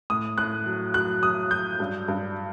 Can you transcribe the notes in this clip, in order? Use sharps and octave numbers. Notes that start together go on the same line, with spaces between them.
A2 D#6
A2 F#6
F#3
F#3 F#6
F#3 D#6
F#3 G6
G2
G2